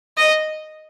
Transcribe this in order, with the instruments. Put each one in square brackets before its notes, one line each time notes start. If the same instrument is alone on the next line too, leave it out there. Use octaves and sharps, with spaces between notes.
[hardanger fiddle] D#5